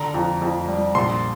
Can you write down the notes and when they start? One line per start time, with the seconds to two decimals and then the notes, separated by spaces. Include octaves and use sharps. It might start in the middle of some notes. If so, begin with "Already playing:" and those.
Already playing: D3 A#5
0.14 F2
0.41 F2
0.68 G3
0.95 A#1 C6